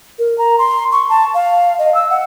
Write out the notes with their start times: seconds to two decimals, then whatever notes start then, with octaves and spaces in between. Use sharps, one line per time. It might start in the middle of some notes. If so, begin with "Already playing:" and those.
0.19 A#4
0.38 A#5
0.59 C6
0.92 C#6
1.09 A5
1.34 F5
1.79 D#5
1.95 E6
2.10 F#5